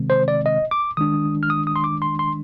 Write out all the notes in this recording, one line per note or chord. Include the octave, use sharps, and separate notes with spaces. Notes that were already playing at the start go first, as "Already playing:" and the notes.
Already playing: C3 D#3 G#3 C4
C5
D5
D#5
D6
D#3 G#3 D4 D#6
F6
D#6
D#6
C6
D6
C6
C6